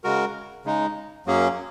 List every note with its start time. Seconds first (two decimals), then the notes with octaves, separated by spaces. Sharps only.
0.04 C#3 G#3 F#4 A#4
0.65 C#3 G#3 D#4
1.26 F#2 F#3 A#3 C#4 G#4